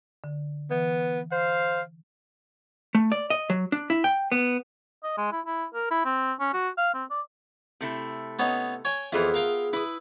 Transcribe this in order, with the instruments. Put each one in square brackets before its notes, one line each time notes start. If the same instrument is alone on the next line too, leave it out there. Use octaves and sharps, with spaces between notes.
[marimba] D3
[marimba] E3 [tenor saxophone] B3
[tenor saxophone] C5 [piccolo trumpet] F5
[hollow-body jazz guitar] A3
D5
D#5
F#3
D4
E4
G5
B3
[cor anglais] D#5
G#3
E4
E4
A#4
E4
C4
C#4
F#4
F5
C4
D5
[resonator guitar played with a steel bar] C3 A3 E4
[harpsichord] B3 C#4 D#4
C#5 G5 G#5
[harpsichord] F2 E3 [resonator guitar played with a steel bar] B3 F4 E5 [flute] G#4
[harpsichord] A#4 F5 G5
[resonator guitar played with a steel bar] E4 [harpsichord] B4 D#6